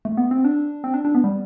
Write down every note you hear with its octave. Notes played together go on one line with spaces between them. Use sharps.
A3
B3
C4
D4
C4
D4
D4
B3
G3